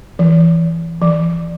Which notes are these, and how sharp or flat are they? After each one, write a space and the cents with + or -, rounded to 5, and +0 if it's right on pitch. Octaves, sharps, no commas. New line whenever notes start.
E3 +10
E3 +35